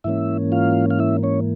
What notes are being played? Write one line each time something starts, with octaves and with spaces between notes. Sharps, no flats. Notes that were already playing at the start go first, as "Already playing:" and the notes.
G#2 E3 A#3 C#4 E4 E5
F4 F5
F5
E4 E5
C#4 C#5